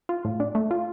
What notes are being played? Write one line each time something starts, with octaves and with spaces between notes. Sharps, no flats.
F4
A2
D4
A3
F4